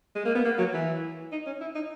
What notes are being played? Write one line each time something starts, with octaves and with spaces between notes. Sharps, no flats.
G#3
A#3
B3
A#3
F#3
E3
D#4
C#4
E4
D#4